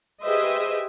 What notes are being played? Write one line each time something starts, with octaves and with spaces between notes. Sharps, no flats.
G4 G#4 B4 C5 D#5 E5